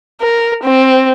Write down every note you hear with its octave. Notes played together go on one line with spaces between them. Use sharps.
A#4
C4